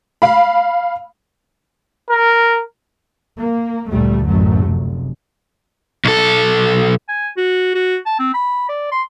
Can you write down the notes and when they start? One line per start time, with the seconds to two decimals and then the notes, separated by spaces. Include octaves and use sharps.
0.22 F5 B5
2.10 A#4
3.38 A#3
3.90 G1 D2 A#2 G3 A3
4.27 A1 F#2 F#3 A3
4.67 F1
6.05 B1 A4
7.09 G#5
7.37 F#4
7.75 F#4
8.06 A5
8.19 C4
8.34 B5
8.69 D5
8.92 C6